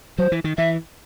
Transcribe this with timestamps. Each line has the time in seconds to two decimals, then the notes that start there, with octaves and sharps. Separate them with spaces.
0.18 F#3 C5
0.32 E3
0.44 D#3
0.57 E3 E5